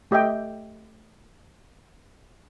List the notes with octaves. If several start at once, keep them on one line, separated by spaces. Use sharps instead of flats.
A3 G4 D#5 E5 G5